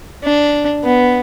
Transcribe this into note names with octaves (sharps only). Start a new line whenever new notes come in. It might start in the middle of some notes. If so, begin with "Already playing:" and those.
D4
B3